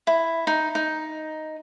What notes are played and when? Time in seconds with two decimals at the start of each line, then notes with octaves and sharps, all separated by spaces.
0.07 E4
0.47 D#4
0.75 D#4